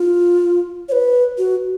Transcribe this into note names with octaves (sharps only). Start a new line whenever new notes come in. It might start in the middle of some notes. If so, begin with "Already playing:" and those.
Already playing: F4
C#5
B4
F#4